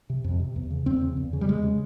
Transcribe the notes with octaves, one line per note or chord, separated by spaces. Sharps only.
C3
F2
C3
E2
C#3
E2 C4
C#3
E2
C#3
G3
E2 G#3
C#3